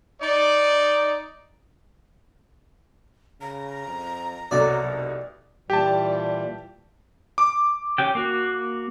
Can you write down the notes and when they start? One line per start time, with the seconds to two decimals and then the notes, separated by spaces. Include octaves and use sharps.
0.21 D#4 D5
3.41 C#3 A#5
3.87 F2
4.51 C2 B2 F#3 A4 D5
4.85 F1
5.70 A#2 E3 G3 G4 A5
7.38 D6
7.98 C#4 G4 G5
8.15 A#3 F#4